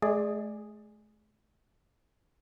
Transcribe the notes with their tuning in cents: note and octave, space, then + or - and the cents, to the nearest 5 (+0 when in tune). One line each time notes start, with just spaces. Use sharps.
A3 -45 G#4 +0 D5 +15